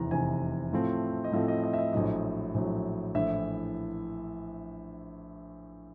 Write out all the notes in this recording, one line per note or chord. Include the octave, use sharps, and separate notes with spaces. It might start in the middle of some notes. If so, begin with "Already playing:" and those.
Already playing: F1 E2 C3 E3 A#5
F1 E2 C3 E3 G#5
A2 F3 A3 C4
D#5
A2 F3 A3 C4 E5
D#5
D#5
E5
D#5
A#1 A2 F#3 D#5
A#1 A2 F#3
A#1 A2 E3 E5